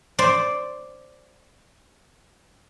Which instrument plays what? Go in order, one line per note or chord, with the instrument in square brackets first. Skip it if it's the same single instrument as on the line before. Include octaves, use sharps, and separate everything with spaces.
[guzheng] C5 D5